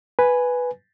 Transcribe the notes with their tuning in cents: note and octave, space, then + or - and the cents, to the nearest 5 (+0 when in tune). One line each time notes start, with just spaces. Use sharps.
B4 +0 G#5 +0